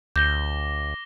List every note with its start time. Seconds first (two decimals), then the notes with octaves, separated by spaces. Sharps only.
0.16 D2 D6 G6 A#6 G7